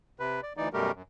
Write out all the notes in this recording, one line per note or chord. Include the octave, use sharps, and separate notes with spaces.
C3 B4
D5
D2 E3 D#4 D5
F#2 B2 G3 A3 G4 A#4
F#2